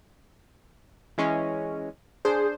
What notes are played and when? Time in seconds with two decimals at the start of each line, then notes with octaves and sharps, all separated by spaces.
1.18 E3 G#3 C#4
2.25 D4 G#4 C5